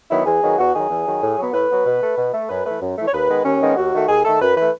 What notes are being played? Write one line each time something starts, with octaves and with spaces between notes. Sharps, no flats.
D#3 F#3 B3 E4
E2 G#4
D#3 F#3 B3
E2 F#4
D#3 F#3 G#4
E2
D#3 F#3
A2
F#3 B3
A2 B4
F#3 B3
B2
A3
B2
A3
F#2 B4
E3 A3 B4
F#2
E3 A3
C#5
D#2 B4
D#3 G#3 B3
D#2 C#4
D#3 G#3 B3
D#2 F#4
D#3 A3
D#2 G#4
D#3 A3 A4
F#2 B4
E3 A3 B4